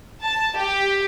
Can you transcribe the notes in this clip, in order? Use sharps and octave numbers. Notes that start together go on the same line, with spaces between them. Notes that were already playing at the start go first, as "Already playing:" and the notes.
A5
G4